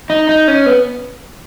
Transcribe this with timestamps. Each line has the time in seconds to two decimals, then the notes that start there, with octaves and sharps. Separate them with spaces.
0.10 D#4
0.29 D#4
0.48 C#4
0.66 B3